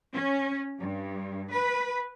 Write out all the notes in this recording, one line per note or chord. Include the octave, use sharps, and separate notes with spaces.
C#4
G2
B4